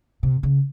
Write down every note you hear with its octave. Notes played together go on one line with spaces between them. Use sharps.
C3
C#3